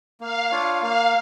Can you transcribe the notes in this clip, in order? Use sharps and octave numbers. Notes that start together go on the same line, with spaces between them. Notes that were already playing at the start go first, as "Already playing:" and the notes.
A#3 F5
D4 F4 C#5
A#3 F5